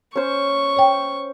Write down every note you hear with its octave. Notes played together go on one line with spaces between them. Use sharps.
C#4 C5 C#6
C#5 G5